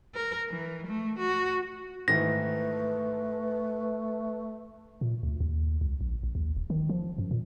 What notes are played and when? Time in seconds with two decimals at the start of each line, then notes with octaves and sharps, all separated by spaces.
0.15 A#4
0.49 E3
0.87 A3
1.18 F#4
2.08 G#2 D#3 E3 A3 B4 A#6
5.01 A#2
5.23 D2
5.40 D#2
5.81 C#2
6.01 A#1
6.23 A#1
6.35 D#2
6.57 D1
6.70 D#3
6.89 F3
7.18 F#2
7.31 A#2